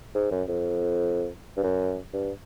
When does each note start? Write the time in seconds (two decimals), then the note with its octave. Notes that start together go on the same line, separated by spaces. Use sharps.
0.15 G#2
0.31 F#2
0.48 F2
1.57 G2
1.64 F#2
2.13 G2